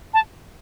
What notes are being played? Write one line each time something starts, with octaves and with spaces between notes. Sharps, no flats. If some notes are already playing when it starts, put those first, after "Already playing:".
A5